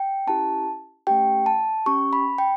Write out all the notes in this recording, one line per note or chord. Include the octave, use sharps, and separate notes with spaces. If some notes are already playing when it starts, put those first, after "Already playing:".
Already playing: G5
C#4 E4 G4 A5
A3 C#4 G4 G5
A5
C#4 G4 C#6
B5
G5